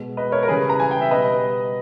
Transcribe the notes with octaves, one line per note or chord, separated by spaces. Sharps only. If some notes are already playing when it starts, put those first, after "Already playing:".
Already playing: B2 G#3
B4 D#5
A#4 C#5
A#4
C#3 E3 G3 G#4 B4
A#5
G#5
G5
E5
B2 G3 B4 D#5